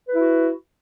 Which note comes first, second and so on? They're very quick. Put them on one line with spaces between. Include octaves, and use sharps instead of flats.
B4 E4 F#4